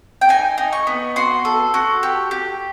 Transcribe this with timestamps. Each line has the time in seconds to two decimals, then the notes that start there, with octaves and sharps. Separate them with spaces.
0.21 G5
0.29 D#4 G#5
0.58 D#4
0.73 C#6
0.87 B3
1.16 F#4 C6
1.45 A4
1.74 F#4
2.03 G4
2.31 G4